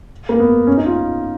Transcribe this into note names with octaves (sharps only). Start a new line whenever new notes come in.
A#3
B3
C#4
D#4
F4